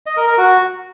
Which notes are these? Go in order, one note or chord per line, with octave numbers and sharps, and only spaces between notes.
D#5
A#4
A#4
F#4